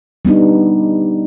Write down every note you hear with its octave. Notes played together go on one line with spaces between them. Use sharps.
G3 B3 D4 D#4